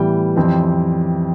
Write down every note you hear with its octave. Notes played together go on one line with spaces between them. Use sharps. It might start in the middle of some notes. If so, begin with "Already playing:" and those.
Already playing: A2 E3 G3 B3 G5
F2 E3 G3 C4